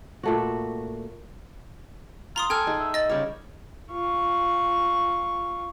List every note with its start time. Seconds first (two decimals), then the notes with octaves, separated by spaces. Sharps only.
0.23 A#2 A3 F#4
2.36 F4 A#5 C6 D#6
2.50 A4 G5 G#5 F6
2.67 D#4 G#4
2.80 E5
2.94 D#5 A6
3.09 C#3 G3 A#4 C#5
3.92 F4 C#6